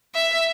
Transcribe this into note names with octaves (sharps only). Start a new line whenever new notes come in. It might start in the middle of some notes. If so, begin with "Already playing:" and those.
E5